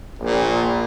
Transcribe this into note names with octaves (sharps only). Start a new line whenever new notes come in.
A#1 A#2